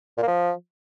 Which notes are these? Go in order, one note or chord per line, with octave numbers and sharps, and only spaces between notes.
A#2
A#3
F3